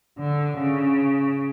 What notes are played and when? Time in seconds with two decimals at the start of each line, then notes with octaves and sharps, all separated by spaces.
0.19 D3
0.58 C#3